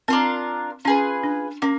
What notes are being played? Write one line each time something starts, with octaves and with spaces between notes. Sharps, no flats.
C4 D4 F4 A#4
C#4 F4 G#4 B4
D4
A#3 C#4